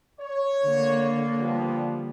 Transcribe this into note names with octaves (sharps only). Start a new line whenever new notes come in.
C#5
D3 A#3
F3 G3 B3